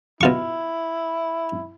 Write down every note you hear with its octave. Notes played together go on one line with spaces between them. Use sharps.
B2 E4 F4 C#6